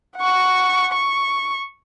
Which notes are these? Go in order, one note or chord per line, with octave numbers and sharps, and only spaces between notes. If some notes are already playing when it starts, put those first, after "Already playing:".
F#5 C#6
C#6